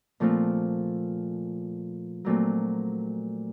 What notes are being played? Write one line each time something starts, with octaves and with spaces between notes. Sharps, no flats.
A#2 F3 A3 C4 F4
A#2 F#3 A3 C4